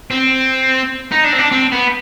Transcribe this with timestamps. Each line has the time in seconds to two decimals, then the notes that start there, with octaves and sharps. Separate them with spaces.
0.11 C4
1.12 D#4
1.24 D4
1.33 C4
1.38 D4
1.52 C4
1.72 B3